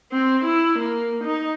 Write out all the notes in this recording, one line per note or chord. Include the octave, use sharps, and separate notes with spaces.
C4
E4
A#3
D#4